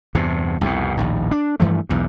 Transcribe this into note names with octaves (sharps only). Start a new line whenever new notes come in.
E2 G2 C3
C2 F2 B2
A#1 D#2 A2
D4
G2 E3 F3 A3
B1 E2 G2